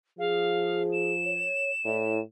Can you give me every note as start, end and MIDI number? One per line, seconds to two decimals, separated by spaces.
0.18 1.50 53
0.18 1.12 68
0.18 0.82 77
0.92 2.18 100
1.24 1.70 73
1.85 2.20 45
1.85 2.14 64
1.85 2.14 74
1.85 2.14 76